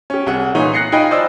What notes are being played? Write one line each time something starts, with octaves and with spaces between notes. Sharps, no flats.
C#4 G4
C2 G#4 F#5
A#2 E3 D#4 C#5
F#6 A#6 C7 C#7
D#4 F4 D#5 G5 G#5 B5
C5 D5 D#5 E6